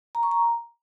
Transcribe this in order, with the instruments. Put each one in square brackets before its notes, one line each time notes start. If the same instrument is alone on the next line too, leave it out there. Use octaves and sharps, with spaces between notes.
[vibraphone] A#5
C#6
A#5